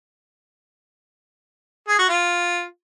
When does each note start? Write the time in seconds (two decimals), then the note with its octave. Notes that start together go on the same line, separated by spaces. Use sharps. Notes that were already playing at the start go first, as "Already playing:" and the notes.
1.88 G#4
1.99 F#4
2.09 F4